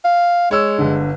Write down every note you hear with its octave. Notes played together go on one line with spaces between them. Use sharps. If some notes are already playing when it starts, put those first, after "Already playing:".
F5
G#3 C#5 E6
G1 D3